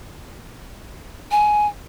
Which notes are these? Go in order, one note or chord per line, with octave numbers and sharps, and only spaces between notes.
G#5